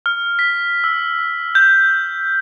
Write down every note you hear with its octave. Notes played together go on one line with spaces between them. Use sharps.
F6
B6
E6
G6